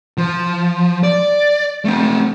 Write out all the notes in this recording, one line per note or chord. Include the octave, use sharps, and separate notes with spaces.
F3
D5
A3 C4